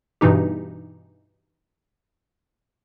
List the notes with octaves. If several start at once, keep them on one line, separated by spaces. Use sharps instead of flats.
G2 B2 E3 D#4 G4